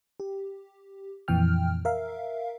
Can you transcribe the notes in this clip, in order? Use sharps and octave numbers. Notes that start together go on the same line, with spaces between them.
G4
F2 A#2 E3 G5 F6
A#4 E5 F5